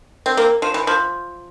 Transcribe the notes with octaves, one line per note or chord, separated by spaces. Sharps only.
C4
A#3
F3
E3
F3